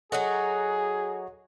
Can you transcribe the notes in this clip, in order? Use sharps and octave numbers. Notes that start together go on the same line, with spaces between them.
F#3 D#4 F#4 G#4 A4 C#5 D#5